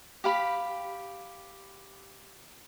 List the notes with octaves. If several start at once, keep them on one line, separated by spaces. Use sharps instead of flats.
G4 F5 B5